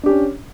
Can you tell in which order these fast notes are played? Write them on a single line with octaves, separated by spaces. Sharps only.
D4 G4 C#4